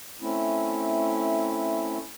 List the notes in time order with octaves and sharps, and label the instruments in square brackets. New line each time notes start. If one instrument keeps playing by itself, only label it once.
[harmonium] A3 C4 C#4 E4